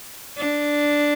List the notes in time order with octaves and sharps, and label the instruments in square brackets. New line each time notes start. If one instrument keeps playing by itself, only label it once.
[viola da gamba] D4